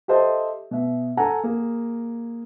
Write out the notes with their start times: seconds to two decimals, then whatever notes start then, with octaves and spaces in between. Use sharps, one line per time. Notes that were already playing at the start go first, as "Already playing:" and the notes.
0.08 G4 A4 C5 D#5 E5 A5
0.71 B2 E5
1.17 A4 F#5 G#5 A#5
1.44 A#3 G#4